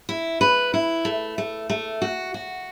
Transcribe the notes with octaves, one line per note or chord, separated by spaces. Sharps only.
E4
B4
E4
A3
A3
A3
F#4
F#4